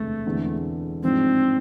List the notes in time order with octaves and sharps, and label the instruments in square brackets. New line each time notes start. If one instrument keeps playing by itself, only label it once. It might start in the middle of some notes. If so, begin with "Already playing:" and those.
Already playing: [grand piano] E1 D2 C3 G#3 B3 [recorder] A3
[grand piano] E1 E2 D3 G#3 C4
[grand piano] A1 G#2 F3 G#3 D4 [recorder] C4